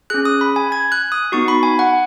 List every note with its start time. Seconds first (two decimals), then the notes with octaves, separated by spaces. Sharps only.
0.10 C#4 G#4 F#6
0.25 D#6
0.41 B5
0.56 G#5
0.72 G#6
0.92 F#6
1.12 D#6
1.32 B3 D#4 F#4 C#6
1.48 B5
1.63 G#5
1.79 F#5